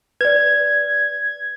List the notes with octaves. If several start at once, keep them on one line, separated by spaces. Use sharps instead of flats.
B4 D5 G#6